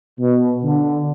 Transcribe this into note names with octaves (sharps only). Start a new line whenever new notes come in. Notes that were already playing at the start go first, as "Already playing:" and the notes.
B2
D3